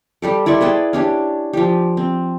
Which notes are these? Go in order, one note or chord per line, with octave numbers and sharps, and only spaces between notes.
G3 G4 A4
E4 D5 C6 C#6
G#4 B4 G5 A5
C#4 D4 G4
F3 G4
C4